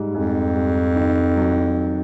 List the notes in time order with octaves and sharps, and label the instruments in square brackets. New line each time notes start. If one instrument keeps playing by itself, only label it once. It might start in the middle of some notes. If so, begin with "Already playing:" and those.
Already playing: [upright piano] G#2 G3
[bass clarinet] F2 [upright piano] G#2
[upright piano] G3
D#3
F#3